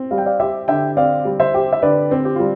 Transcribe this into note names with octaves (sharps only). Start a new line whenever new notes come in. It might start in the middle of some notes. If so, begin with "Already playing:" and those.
Already playing: C4
G3 F5
G5
D5 F5
G4 C5 E5
D3 E5 G5
C4 D5 F5
G3
C5 E5
G4
E5
D3 B4 D5
C4
G4
G3 F4